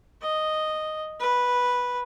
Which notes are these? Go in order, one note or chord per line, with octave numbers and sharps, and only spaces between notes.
D#5
B4